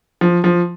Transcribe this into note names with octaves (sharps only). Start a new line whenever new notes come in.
F3
F3